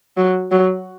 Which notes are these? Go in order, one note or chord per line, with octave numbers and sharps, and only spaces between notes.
F#3
F#3